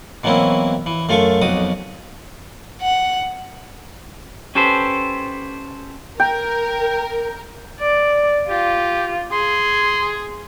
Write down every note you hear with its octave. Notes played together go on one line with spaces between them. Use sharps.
B2 E3 F#3 A#3 C4 E4
E3
F#2 A3 F4 A4 A5 C#6
B1 F2 F#4 D6 D#6
F#5
C#4 G4 A4 B4 C5
A#4 G5
D5
F4 G4
G#4 C6